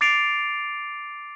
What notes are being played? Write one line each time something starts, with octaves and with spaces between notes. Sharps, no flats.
D6 A6 C7 D7 F7